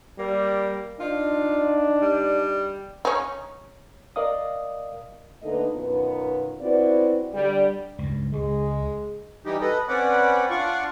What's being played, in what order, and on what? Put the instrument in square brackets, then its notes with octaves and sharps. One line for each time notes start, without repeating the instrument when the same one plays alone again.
[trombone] G3 [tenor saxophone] A#3
[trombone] D4 [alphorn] D#4 [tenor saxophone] F4
[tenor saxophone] G3
[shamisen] C#4 D#4
[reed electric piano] A#4 D5 D#5 F5 D#6
[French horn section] D3 A3 A#3 D#4 B4 D#5
F#2 B2 D#3 B3 F4
B3 C4 E4 F#4 B4 D5
D3 G3
[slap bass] C#2 G2
[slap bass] C#2 [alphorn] G#3
[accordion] E3 G3 D#4 G4
A4 B4 D#5
C4 C#4 B4 D5 F#5
D4 F4 D5 F#5 C#6